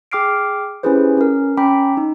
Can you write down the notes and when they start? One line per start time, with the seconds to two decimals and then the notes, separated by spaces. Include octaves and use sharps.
0.12 G#4 G5 D6 F6 C7 D7
0.83 C#4 E4 G4 G#4 B4 C5
1.17 C#4 A#4
1.57 C#4 G5 A#5 B5 D6 B6
1.97 D#4